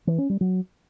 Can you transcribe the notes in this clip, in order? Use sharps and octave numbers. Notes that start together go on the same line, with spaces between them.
E3
C#4
G3
F#3